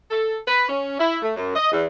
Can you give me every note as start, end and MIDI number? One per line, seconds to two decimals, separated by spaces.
0.11 0.36 69
0.48 0.66 71
0.69 0.96 61
1.00 1.18 64
1.22 1.35 57
1.37 1.53 42
1.56 1.71 75
1.72 1.85 40